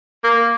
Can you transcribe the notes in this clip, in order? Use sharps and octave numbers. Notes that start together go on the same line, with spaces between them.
A#3